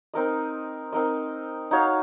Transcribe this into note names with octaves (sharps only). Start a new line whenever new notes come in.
C4 D#4 A#4 D#5
C4 D#4 A#4 D#5
D#4 F#4 C#5 F5